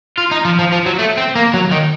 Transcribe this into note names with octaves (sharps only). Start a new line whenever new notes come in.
F4
D#4
F3
F3
F3
F#3
A3
C4
A#3
F#3
D#3